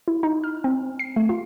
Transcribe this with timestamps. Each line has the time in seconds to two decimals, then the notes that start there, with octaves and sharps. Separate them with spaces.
0.08 E4
0.23 D#4
0.44 F6
0.64 C4
0.99 C7
1.16 A3
1.29 F4